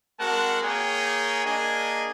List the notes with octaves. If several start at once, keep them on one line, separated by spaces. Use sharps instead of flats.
G#3 C4 F#4 A#4 F#5 A5
A#3 G#4 C#5 G5 G#5 A#5
A#3 D4 G#4 D#5 G#5 A#5